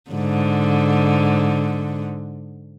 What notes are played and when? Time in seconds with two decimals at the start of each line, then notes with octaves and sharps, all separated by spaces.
0.11 G#2 D3